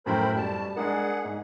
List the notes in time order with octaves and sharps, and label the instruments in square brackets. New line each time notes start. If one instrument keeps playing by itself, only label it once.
[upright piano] F#2 A2 G5 [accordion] A#4 C5 B5
[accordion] B2 A5 [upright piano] G3
[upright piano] G#3 D4 A#4 [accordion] G#4 F#5
[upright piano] G#2